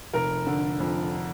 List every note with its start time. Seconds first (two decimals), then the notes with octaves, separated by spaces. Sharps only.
0.14 F1 A#4
0.47 D3
0.80 F2